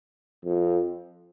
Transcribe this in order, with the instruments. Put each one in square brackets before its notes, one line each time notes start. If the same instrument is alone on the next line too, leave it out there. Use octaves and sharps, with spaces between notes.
[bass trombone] F2